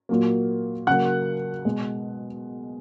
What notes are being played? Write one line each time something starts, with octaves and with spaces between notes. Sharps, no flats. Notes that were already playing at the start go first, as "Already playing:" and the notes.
A#2 F#3 A#3
C#3 F#3 A#3 F#5 F#6
B2 G#3